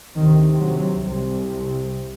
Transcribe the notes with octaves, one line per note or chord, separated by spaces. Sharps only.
D2 C3 D#3
F#3
C2 C3